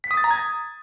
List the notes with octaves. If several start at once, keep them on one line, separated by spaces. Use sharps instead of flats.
B6
D#6
A6
A#5
G#6